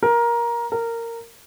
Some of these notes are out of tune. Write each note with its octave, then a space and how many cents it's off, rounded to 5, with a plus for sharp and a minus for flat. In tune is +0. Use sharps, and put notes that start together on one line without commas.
A#4 +15
A#4 -15